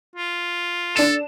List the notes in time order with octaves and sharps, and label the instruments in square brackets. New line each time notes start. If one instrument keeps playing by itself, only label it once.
[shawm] F4
[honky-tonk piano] D4 E7 [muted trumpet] A4